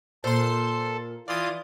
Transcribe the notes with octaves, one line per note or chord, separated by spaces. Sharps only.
A#2 A4 C5 C6
E3 F4 D5 D#6